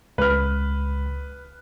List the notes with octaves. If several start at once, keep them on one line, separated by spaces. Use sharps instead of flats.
C#2 B4 F6